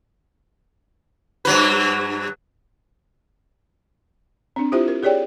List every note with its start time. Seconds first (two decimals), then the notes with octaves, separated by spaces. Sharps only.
1.45 G2 F#3 B4
4.56 C4 D4
4.72 E4 F4 G4 C5 E5
4.88 A#4
5.03 G4 G#4 C#5 D5 G5